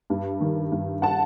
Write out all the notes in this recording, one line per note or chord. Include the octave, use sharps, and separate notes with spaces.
G2
D#3
G2
F#5 A5